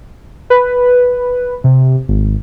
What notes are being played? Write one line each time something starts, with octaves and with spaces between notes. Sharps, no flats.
B4
C3
G#1